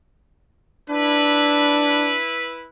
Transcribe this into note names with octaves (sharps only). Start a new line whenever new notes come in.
D4 E4 B4